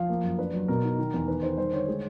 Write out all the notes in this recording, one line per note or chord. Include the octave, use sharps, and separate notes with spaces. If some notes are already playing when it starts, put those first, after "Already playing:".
Already playing: F3 F5
A#3
F#2
D4 B4
F#3
B2 A#4
D#4
D#3
E2
D#3 B4
D#3 C5
G3 C5
D3 C#5
G#3 C#5